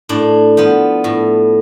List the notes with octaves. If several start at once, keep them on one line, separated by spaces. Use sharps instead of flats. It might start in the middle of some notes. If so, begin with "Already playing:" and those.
A2 D4
F3 B3
A2